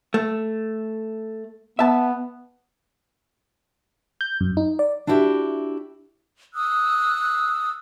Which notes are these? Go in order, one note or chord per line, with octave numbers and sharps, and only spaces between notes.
A3
B3 E5 A5
G6
F#2
D#4
D5
D4 E4 F#4 G4 D#5 E5
D#6 E6 F#6